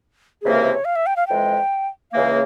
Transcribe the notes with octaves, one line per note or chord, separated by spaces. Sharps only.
C#2 C3 E3 A#3 G#4
A#4
C5
C#5
F5
E5
G5
F5
F2 E3 G#3 G5
C#2 C#3 E3 A#3 F5